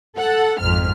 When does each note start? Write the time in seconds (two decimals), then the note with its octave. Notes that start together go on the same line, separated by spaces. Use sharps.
0.16 A4 F#5
0.60 G#1 F2 F6